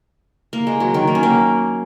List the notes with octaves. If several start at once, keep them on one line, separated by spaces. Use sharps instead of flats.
A#3
G#3
F#3
D#3
A#3
C#4
A#3